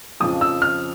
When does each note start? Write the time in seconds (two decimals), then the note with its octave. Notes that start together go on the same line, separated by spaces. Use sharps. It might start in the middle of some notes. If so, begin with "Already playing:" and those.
0.20 F2 C#3 F3 D#6
0.41 E6
0.62 F6